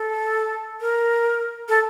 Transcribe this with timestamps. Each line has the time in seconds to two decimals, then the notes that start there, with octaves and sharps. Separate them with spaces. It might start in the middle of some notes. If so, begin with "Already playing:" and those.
Already playing: A4
0.81 A#4
1.69 A4